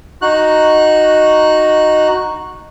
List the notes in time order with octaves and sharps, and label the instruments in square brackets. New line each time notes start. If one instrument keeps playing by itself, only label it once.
[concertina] D#4 F#4 F#6